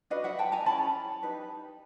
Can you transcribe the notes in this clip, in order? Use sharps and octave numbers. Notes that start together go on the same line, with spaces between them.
D4 F#4 B4 D#5 F5
E5 F#5
G5 A5
G#5 A#5
C#4 E4 G#4 A5 B5
D#4 G4 B4